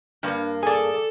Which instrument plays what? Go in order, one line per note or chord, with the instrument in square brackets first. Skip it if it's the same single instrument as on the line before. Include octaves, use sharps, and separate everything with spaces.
[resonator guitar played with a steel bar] G2 A#3 [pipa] G3 B4
[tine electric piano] G#4 D5 [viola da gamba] A4 [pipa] G#5